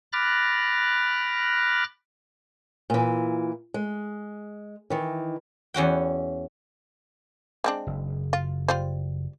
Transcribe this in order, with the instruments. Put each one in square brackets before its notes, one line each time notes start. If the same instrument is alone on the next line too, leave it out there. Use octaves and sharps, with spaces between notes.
[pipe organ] B5 D6 F6 F#6 A6 A#6
[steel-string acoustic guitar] A#2 E3
G#3
D#3 E3
[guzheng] E2 C#4 F#4 G5
[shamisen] G#3 C4 D4
[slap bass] F#1
[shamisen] F4
G3 F4 C5